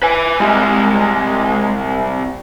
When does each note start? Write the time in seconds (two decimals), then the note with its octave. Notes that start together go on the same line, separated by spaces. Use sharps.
0.02 B4 G#5
0.40 C2 G3 G#3